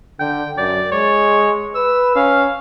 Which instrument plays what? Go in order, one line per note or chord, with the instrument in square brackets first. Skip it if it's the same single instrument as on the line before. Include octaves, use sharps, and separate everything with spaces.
[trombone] D3 [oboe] G5
[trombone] F#2 [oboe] D5
[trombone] G#3 [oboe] C#5
[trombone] B4 [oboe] E6
[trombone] C#4 [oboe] F5